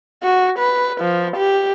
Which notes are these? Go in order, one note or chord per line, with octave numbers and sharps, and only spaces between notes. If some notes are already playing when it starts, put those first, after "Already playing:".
F#4
B4
F3
G4